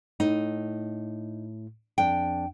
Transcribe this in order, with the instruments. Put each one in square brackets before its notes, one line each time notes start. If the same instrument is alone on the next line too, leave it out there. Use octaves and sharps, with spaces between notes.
[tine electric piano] A2 [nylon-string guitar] D#4
[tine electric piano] F2 D4 [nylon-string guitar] G5